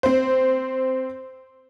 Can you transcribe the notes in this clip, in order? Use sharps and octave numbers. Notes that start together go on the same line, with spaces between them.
C4 C5